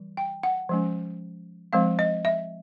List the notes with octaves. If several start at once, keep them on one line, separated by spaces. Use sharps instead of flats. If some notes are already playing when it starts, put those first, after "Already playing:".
Already playing: E3 G3
G5
F#5
F3 G#3 C#4
F3 G#3 C4 F5
D#5
E5